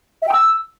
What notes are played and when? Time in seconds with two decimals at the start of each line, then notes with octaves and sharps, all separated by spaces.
0.21 E5
0.26 G5
0.31 E6